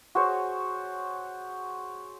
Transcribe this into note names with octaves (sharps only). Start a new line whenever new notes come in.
F#4 G#4 C5 C#5